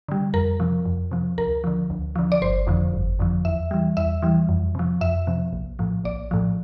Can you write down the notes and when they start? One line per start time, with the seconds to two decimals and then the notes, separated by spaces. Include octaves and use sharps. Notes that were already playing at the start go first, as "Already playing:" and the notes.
0.09 D3 G3
0.34 F2 A#4
0.60 C3 F3
0.86 F2
1.11 C3 F3
1.38 D2 A#4
1.64 D3 F3
1.90 D2
2.16 D3 F3
2.32 D5
2.42 G1 C5
2.67 F2 D3 F3
2.94 G1
3.19 F2 D3 F3
3.45 E2 E5
3.71 E3 G3
3.97 E2 E5
4.22 E3 G3
4.49 F2
4.75 C3 F3
5.01 F2 E5
5.27 C3 F3
5.53 A#1
5.79 A2 F3
6.04 A#1 D5
6.31 A2 F3